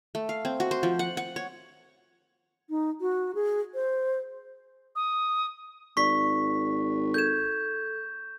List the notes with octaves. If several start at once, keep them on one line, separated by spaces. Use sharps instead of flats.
A3
F5
C4
F#4
C5
F3
F#5
F#5
C#5
D#4
F#4
G#4
C5
D#6
G#1 D5 C#6 B6
A4 G6 G#6 E7